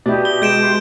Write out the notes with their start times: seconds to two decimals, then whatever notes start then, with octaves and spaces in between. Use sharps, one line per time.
0.06 B2 E4 G4 D5 D#5
0.25 G7
0.42 G#3 G6 D7 E7
0.59 G4 C6